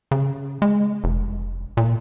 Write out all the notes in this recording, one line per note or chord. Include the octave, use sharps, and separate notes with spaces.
C#3
G#3
F1
A#2